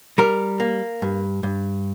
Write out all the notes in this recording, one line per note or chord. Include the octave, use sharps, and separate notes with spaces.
G3 A#4
A#3
G2
G2